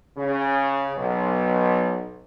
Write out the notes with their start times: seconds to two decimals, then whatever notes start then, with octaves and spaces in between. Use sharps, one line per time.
0.17 C#3
0.96 B1